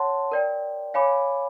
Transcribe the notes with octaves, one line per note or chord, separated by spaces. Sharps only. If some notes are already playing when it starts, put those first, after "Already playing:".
Already playing: C#5 F#5 A5 C6
A#4 D5 G5
C#5 F5 G#5 B5 D6